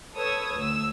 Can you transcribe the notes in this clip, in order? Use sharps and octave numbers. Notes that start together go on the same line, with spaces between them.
A4 B4 C#5 D#6 E6 G#6
D2 E6